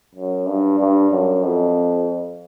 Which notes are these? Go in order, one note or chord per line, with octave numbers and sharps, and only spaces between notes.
F#2
G2
G2
F#2
F2